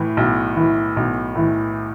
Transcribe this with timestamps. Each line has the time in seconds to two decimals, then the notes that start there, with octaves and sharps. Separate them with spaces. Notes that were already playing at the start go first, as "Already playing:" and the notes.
Already playing: A2 E3
0.17 B1
0.57 A2 E3
0.97 B1
1.35 A2 E3